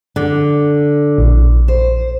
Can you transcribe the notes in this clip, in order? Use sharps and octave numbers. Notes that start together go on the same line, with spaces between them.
D3
A#1
C5